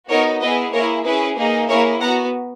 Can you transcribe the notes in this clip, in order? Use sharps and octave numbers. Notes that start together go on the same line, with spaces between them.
B3 D#4 F#4 A#4 C#5
B3 E4 G#4 B4 D#5
A#3 E4 G#4 A#4 C#5
C#4 E4 G#4 B4
A#3 D#4 G#4
A#3 E4 G#4 A#4 C#5
B3 F#4 F#5 A#5